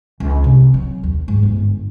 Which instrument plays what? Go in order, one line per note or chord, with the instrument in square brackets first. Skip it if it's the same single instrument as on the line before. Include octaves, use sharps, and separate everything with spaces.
[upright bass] C#2
C3
F#3
D#2
G#2
G1